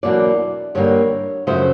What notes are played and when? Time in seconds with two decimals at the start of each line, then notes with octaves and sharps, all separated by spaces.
0.03 E2 B2 F#3 A#3 D4 D5
0.75 G2 D3 G3 A#3 C#5
1.47 F#2 C#3 F3 A3 C5